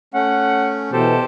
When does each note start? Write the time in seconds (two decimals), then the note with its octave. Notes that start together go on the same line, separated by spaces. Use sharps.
0.14 A3 C#4 F#5
0.92 B2 E3 G4 A4 C5